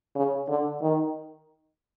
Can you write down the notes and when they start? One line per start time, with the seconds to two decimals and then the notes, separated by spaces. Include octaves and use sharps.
0.15 C#3
0.48 D3
0.82 D#3